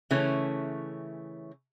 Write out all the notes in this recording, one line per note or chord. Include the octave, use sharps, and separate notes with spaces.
C#3 E3 A3 C#4